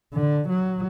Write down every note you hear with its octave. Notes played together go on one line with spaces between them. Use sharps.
D3
F#3